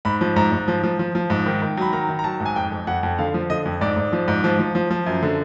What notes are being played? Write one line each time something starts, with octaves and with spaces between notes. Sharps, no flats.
G#2 B5
F3
G#2 A#5
G#2
F3
F3
F3
F3
G#2
D#3
D#3
F#3 B5
D#3 A#5
D#3
A#5
F#3 A5
G#2
G#5
F2 G5
F2
F2 F#5
F2
D3 F5
F3
D3 D#5
F2
G#2 D5
G#2
F3
G#2
F3
F3
F3
F3
F#2
D3